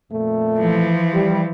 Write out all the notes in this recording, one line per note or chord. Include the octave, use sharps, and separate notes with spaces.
F2 A#2 A3
E3 F3
G3